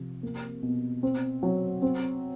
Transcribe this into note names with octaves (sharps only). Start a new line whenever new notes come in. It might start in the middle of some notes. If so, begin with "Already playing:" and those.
Already playing: C3 F3
A#3
B2
C4
F#3
C4